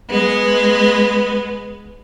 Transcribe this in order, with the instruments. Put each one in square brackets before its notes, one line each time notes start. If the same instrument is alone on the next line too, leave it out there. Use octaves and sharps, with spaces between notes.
[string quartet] G#3 B3